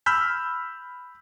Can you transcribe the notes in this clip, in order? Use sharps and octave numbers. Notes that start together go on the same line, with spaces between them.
B5 E6 F6 G6 B6